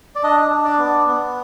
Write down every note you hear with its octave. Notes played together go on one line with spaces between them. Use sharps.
D5
D4 D#5
D4
D5
B3
B3